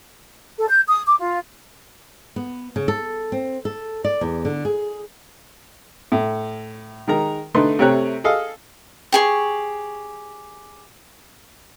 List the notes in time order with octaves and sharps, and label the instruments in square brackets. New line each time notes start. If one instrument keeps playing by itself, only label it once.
[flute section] A4
G6
D#6
D6
F4
[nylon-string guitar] B3
C#3
A4
C4
A4
D5
E2
D3
G#4
[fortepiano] A2
D#3 G#3 A#4 A#5
D3 A3 D#4 B4 C6
C3 A3 C4 C#5 A#5 F#6
G#4 A4 D#5 F5
[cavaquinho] G4 G#4 C#6